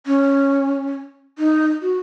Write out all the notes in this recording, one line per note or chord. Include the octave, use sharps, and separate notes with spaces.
C#4
D#4
F#4